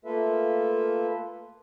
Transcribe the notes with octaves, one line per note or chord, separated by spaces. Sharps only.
A3 A#3 F4 A4 B4 E5